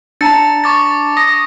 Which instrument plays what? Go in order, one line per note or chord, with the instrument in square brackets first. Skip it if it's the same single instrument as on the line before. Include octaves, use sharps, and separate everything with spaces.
[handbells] D4 A5 A#5 [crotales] A6 C#7
[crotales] C#6 D6 A6
[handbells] D#6 [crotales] A#6